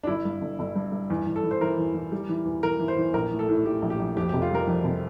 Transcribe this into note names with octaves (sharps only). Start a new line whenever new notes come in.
D4
G1 E4
G2
G1
G1
G2
G2
E2
E2
A4
E3
C5
E3 A#4
E2
E2
G3
E3
E2
E2 A#4
E3
C5
E2
A#1 A#4
A2
A4
A2
A2 G4
A#1
G4
A#1
F2 G4
F1 G4
F4
G3 A#4
F2
F1